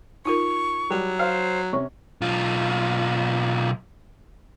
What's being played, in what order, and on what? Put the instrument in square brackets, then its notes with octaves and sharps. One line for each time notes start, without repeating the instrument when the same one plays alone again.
[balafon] D#4 F4 A#4 [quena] C#6
[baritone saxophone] F#3 [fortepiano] G3
[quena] C5 [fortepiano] F5
[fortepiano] C3 C#4 [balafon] C#6
[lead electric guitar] B1 F4